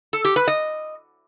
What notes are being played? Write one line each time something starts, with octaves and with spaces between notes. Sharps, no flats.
A4
G4
B4
D#5